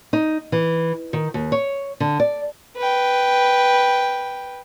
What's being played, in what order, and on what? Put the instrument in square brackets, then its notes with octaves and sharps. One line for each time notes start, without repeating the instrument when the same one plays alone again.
[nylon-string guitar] D#4
E3
D#3
D#2
C#5
D3
D5
[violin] B4 G5